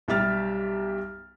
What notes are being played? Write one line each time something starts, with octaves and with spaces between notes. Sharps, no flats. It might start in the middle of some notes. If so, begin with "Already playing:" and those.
B1 G3 G4 E5 F6 A6